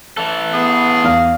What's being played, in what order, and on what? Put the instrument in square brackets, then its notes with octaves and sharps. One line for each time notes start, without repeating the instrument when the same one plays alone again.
[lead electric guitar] E3 A4
[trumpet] B3 [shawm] G#4
[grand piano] E2 F5 F6